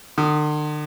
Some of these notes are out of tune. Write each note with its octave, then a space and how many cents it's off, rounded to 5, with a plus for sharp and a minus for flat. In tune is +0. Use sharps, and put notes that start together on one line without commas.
D3 +45 D#6 +0